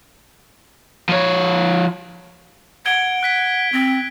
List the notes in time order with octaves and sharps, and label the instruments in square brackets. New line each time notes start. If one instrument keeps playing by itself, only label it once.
[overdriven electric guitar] F3 C#5
[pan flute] F#5 [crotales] G#6 D7 G7
[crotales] F#6 B6 D7
[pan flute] C4